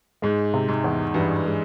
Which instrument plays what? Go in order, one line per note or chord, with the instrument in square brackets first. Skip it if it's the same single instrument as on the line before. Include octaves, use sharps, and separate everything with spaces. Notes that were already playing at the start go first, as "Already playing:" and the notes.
[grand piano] G#2 [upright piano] G#3
[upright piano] C3
[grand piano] G#2
[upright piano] E2
[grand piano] G2 [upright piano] E3
[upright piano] G#3